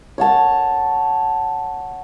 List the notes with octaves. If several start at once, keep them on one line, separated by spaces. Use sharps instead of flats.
C#5 F#5 A5